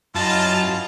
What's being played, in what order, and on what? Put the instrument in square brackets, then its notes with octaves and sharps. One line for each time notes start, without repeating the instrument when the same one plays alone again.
[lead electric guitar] F#2 [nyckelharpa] E4 D#5 [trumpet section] F4 [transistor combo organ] A5